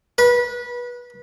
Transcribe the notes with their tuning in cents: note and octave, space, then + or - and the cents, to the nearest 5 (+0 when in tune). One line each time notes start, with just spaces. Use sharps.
B4 -25